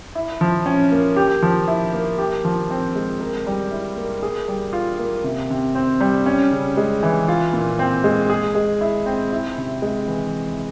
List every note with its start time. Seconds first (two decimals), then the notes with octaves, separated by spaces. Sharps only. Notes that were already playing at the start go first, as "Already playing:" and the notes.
0.15 E4
0.41 F3
0.66 C#4
0.92 A#3
1.16 G4
1.42 F3
1.68 E4
1.93 A#3
2.18 G4
2.45 F3
2.70 C4
2.95 G#3
3.20 A#4
3.47 G3
3.71 E4
3.97 A#3
4.23 G#4
4.48 G3
4.73 F4
4.99 A#3
5.24 C3
5.50 C3
5.75 C4
6.01 G3
6.26 C#4
6.52 C#3
6.77 G#3
7.03 E3
7.28 F4
7.53 A#2
7.79 C4
8.04 G#3
8.30 G#4
8.55 G#3
8.81 E4
9.06 C4
9.32 E4
9.58 C3
9.82 G#3
10.07 E3